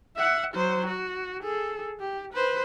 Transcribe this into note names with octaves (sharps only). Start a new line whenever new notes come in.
E5 F#5
F#3 C5
F#4
G#4 A4
G4
B4 C5